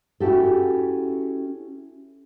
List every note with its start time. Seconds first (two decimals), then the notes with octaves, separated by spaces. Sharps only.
0.20 C#4 E4 F#4 G4 A4